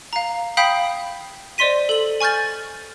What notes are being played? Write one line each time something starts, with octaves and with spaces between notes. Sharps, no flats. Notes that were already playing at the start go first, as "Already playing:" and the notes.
F5 A#5
F5 G5 B5 D#6 G6 B6
C5 D5 D#5 C6 B6 D#7
A4 F#7
G#5 C#6 F6 G6 A6